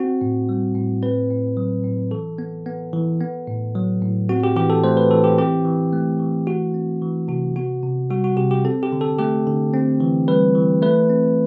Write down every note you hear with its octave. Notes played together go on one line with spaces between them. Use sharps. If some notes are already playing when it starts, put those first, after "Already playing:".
Already playing: C4 F#4
A2
G3
A2
C4 B4
A2
F#3
A2
E3 A4
B3
B3
E3
B3
A2
F#3
A2
C4 F#4
G4
E3 G4
A4
A3 C5
B4
E3 A4
G4
C4 G4
E3
A3
E3
A3 F#4
C4
E3
C3 F#4
B3 F#4
C3
G3 F#4
F#4
C3 G4
G4
C4 A4
G4
D3
A4
A3 G4
D3
C4
E3
G3 B4
E3
A3 B4
C4